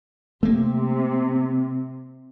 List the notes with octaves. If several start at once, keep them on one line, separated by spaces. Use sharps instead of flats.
C3 A3 A#3